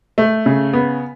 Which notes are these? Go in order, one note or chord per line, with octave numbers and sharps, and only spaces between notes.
A3
C#3
B3